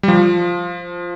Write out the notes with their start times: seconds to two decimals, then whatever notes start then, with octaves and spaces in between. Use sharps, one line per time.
0.03 G3
0.08 F3